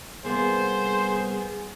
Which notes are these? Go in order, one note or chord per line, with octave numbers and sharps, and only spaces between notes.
C2 A#3 B3 G#4 C5